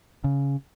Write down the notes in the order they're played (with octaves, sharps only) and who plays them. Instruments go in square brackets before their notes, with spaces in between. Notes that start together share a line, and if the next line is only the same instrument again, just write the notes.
[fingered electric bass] C#3